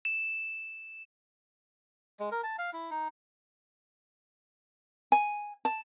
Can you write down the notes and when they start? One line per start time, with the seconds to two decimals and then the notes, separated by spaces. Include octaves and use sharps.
0.05 E7
2.20 G#3
2.32 A#4
2.43 A5
2.59 F5
2.73 E4
2.91 D#4
5.12 G#5
5.65 A5